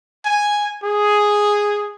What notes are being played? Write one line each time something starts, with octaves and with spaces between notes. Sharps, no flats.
G#5
G#4